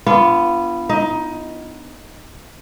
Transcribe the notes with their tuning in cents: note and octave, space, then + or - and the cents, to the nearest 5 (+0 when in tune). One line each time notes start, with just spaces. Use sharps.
B3 +0 D4 +0 F4 -30
D#4 +15 D#5 +20